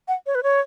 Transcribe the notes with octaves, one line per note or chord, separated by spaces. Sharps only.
F#5
C#5
B4
C#5